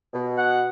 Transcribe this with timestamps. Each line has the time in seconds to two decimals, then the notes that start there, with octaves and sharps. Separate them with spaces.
0.13 B2
0.36 F#5